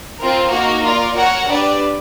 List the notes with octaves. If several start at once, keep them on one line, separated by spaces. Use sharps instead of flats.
C4 F4 A#4
A#3 D#4 F#4 A#4
F4 A#4 D5
F#4 A#4 C#5 F#5
D4 G4 B4 D5